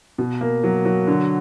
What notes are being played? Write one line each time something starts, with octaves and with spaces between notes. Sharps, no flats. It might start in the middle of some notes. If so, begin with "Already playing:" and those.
B2
A#3
F#3
F#3
D3